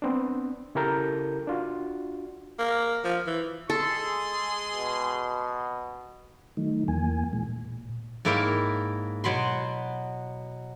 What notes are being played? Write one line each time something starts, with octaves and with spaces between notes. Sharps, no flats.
B3 C4 D4
C#3 E4 G4 A4 A#4 G6
D4 F4 F#4
A#3
F3
E3
G#3 G#4 A4 C6
B2
D#3 F#3 A3 D#4
E2 E3 A#3 G#5
A#2 E3 G#3
A#2
G#2 A#3 E4 A#4 C#5 G5
B2 F#3 B5 C6